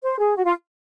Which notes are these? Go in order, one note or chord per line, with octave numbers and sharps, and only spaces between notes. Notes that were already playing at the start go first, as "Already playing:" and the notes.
C5
G#4
F#4
F4